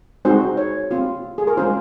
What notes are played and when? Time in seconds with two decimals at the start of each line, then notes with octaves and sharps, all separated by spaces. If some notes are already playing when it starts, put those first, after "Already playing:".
0.25 G#3 C4 D#4 F#4 C5
0.57 C#5
0.91 C4 F4
1.38 G#4
1.47 A#4
1.57 G#3 C#4 F4 C5